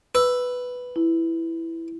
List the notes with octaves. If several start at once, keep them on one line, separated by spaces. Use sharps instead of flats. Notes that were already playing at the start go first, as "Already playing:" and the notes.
B4 E6
E4